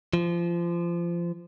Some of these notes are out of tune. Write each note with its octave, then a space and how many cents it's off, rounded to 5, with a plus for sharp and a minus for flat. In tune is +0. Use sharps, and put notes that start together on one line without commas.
F3 -25